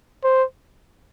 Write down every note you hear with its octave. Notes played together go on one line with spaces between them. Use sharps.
C5